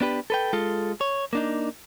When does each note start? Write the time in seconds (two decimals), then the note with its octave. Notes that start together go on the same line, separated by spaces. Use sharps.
0.01 B3 D4 G4 B4
0.30 A4 B4 G5
0.53 G#3 F4 A4
1.01 C#5
1.33 A#3 D4 D#4